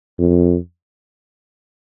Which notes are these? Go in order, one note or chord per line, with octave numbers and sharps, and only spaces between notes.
F2